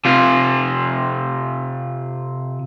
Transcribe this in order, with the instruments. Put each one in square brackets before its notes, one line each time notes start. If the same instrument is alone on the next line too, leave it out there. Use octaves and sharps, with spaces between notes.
[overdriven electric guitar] C3 F4